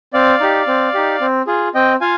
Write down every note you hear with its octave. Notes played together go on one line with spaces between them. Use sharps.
C4 D5 F5
D#4 G4
C4
D#4 G4
C4
F4 G#4
C4 D#5 G5
F4 F5 G#5